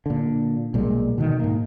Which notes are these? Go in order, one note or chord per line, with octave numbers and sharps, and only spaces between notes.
A#2 D3
B1 A#2 G3 G#3
B2 D3 D#3
G#2 A#3